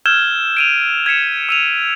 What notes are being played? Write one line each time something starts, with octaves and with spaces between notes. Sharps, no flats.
E6 F6 G6 G#6 E7 G7
D7 D#7 F7
G#6 B6 C#7 E7
E6 D#7 F7